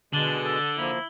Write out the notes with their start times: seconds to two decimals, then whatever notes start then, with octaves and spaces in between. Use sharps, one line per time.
0.13 B2 D3 G#3 D4 F#7 G7
0.45 A4
0.78 F3 A#3 E4